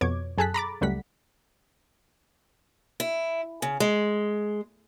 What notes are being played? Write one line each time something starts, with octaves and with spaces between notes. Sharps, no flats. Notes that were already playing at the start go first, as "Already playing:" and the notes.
F2 B2 C#5 D6 G#6
F#2 G#4 A4 A5 F#6 B6
A#5 B5 D6 A6
C#2 F#2 G3 A3 F#5 B6
E4
C#3
G#3